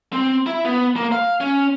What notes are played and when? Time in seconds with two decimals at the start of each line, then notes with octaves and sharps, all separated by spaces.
0.13 C4
0.46 E4
0.65 B3
0.96 A#3
1.12 F5
1.41 C#4